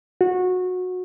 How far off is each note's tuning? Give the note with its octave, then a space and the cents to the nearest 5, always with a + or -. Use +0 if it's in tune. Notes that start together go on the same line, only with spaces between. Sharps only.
F#4 -20